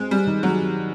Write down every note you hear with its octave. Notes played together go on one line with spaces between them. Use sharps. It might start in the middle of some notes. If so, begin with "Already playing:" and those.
Already playing: G#3 C4
G3
D#3
F#3